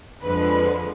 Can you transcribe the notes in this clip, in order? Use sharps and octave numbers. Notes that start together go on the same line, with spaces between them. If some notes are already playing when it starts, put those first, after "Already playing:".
F2 D3 F3 G#3 B4